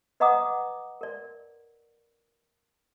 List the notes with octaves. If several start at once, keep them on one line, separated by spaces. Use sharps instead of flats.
B4 D#5 F#5 A#5 D6 D#6
A#4 D5